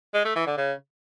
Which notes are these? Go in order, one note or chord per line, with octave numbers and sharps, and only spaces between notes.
G#3
A3
E3
D3
C#3